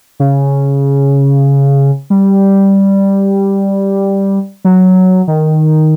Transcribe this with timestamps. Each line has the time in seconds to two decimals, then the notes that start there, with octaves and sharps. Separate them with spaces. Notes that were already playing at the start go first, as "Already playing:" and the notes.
0.20 C#3
2.10 G3
4.65 F#3
5.28 D#3